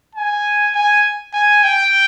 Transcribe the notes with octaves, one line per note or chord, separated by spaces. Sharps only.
G#5
G#5
G#5
G5